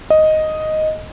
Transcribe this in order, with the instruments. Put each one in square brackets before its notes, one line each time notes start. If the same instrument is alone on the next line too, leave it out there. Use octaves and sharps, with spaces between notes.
[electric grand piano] D#5